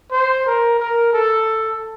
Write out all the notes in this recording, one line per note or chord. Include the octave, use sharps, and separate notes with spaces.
C5
A#4
A#4
A4